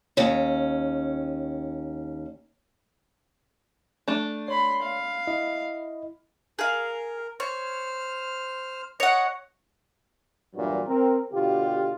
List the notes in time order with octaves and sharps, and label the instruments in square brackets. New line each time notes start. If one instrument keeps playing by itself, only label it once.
[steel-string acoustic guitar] D#2 C#4
[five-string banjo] A3 D4
[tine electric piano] C#5 [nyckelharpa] B5 C6
[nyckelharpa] F5
[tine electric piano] E4 D#5
[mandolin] G#4 F5 [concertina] A#4
[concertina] C5 F6 [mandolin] C#5
[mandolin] C#5 F#5 [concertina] D#5
[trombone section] E2 G2 A#2 F#3 E4 F#4
C4 A#4
B2 D3 F4 G4